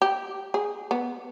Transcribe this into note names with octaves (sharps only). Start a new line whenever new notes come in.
G4
G#4
B3